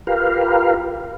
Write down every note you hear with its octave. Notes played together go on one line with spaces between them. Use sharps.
F4 G4 A#4 B4 F5